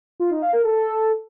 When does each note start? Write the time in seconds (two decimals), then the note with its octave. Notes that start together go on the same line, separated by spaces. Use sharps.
0.20 F4
0.31 D#4
0.42 F5
0.53 A#4
0.64 A4